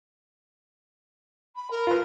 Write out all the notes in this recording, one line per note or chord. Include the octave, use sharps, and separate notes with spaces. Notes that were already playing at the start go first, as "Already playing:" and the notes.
B5
A#4
F4 B4